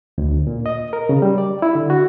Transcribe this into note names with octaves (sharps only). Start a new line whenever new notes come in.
D2
A#2
D#5
A#4
C#3
G3
D5
E4
D3
F#4